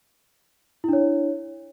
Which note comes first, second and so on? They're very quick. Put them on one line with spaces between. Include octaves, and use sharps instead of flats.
E4 D4 C#5